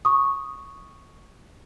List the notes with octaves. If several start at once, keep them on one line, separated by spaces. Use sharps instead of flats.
C#6 D#6